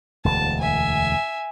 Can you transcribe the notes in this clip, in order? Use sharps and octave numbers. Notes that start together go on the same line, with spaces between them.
E1 D2 A5
E5 G#5